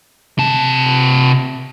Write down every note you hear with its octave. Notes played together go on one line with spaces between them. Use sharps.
C3 A5